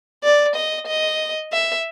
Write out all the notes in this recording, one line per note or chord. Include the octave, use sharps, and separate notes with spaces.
D5
D#5
D#5
E5